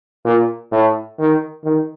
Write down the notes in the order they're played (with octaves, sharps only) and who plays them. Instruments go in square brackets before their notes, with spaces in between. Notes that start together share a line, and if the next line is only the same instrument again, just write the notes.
[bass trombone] A#2
A2
D#3
D#3